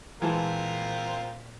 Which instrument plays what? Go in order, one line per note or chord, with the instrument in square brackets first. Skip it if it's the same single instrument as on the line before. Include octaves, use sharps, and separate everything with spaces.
[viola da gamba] A#2 [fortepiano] E3 G#3 A5 [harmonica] C4 F4 A#4